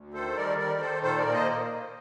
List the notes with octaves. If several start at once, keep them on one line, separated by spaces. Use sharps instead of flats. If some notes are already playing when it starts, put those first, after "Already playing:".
Already playing: D2
D#3 A4 C5
G3 A#4 D5
D#3 A#4 D5
D#3 A4 C5
A#2 A4 C5
A#4 D5
A#3
C5 D#5